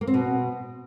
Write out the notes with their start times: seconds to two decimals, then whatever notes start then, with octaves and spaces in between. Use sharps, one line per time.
0.01 A#3
0.07 C4
0.14 B2